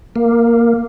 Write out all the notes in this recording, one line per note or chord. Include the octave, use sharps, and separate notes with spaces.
A#3